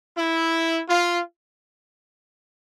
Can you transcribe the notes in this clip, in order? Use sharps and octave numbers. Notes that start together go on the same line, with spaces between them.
E4
F4